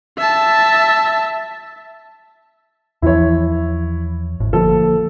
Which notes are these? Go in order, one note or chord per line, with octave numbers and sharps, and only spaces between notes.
E5 A5
E2 E3 F3 E4 C#5
G#1 A2
D3 F3 A#3 A4